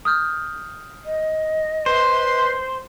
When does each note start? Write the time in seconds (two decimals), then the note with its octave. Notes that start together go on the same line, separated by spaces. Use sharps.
0.05 D#6 F6 G6
1.05 D#5
1.86 B4 C5 C6